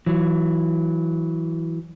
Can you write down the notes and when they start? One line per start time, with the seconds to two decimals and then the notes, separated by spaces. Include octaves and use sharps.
0.06 E3 F#3